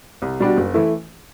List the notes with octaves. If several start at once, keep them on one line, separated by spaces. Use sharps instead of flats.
C2
B2 G3 D4 F#4
F#1
E3 A3 E4